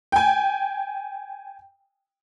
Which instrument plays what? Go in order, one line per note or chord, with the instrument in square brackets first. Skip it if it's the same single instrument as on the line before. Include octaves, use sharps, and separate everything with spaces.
[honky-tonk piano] G5 G#5